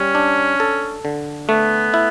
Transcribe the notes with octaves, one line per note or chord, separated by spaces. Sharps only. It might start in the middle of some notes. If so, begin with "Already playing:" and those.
Already playing: G3 C#4
D4
A4
D3
A3 B3
E4